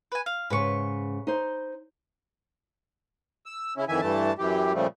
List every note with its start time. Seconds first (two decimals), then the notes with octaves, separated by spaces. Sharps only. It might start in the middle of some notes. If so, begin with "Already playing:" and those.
0.12 B4 G#5
0.26 F5
0.50 G#2 C#3 B4 C#6
1.27 D#4 C5
3.46 E6
3.77 C#3 C#4 E4
3.89 F2 D#3 E3 E5 G#5
4.01 G2 E3 A3 A5
4.38 F#2 E3 G4
4.74 A#2 C#3 F3 G3 A3